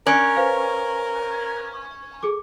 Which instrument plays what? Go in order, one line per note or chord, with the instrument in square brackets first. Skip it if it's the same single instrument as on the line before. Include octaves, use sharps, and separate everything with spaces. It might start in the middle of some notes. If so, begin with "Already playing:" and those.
[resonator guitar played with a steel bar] C#4 [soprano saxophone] A#4 [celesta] D5 F#6 D7
[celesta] B4 C5 F5
G#4 A4 D6